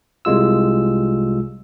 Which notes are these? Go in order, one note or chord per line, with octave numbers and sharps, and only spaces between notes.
C2 C3 G#3 F4 E6